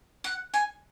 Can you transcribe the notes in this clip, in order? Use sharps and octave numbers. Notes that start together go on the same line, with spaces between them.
F#5
G#5